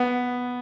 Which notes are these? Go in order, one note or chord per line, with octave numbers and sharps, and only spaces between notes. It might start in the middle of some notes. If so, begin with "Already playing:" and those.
Already playing: B3